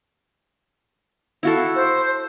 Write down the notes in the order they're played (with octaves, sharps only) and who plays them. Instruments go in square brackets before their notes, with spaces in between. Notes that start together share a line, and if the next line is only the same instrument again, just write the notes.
[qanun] E4 F#4 A4 [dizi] F5
[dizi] C5